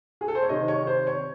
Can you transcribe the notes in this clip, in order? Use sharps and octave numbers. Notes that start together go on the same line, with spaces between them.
G#4
A4
C5
C#5
C3 D#3 D#5
C#5
C5
C#5